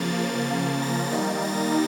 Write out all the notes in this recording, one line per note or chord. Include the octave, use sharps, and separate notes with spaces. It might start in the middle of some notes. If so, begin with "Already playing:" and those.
Already playing: C#3 F3 A#3 A6
A#6
D#3 G3 A#3 D#4 A6
A#6